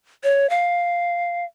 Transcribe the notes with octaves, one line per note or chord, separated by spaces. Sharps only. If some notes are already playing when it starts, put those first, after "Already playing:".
C#5
F5